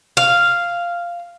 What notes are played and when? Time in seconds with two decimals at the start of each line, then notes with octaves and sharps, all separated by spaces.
0.17 F5